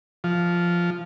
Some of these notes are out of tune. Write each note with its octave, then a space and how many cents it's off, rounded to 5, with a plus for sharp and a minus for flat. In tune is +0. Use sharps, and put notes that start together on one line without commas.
F3 -5